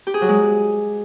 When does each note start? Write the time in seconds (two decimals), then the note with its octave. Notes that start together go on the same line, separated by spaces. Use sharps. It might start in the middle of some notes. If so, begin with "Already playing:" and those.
0.07 G4
0.14 G#4
0.21 F#3
0.29 G#3